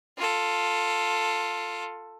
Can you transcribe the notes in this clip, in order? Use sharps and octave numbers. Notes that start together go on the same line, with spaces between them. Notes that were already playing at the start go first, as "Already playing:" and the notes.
F4 A4